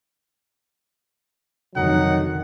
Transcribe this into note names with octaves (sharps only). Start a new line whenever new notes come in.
F1 D3 D#3 F#3 D#4 F#5